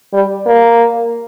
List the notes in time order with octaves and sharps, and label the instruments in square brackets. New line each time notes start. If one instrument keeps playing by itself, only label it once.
[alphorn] G3
A#3